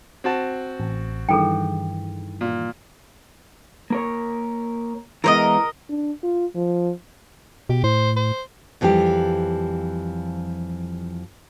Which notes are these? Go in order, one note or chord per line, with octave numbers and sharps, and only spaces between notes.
C4 F#4 A5
A1
G2 D#3 E3 G#4 A4 G5
A#2
A#3 A#4 C#5
E3 G#3 B3 A#4 C5 D#5
D4
F4
F3
B2 G4
A2 C5
C5
F2 E3 F3 G3 G4